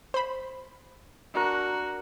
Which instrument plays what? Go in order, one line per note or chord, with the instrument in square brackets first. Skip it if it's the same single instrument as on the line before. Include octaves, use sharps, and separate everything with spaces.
[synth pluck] C5 B5
[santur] D4 A#4 [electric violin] F#4